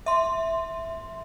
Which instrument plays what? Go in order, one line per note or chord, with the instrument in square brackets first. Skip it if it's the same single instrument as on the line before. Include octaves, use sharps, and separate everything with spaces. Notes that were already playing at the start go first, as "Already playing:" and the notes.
[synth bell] E5 C6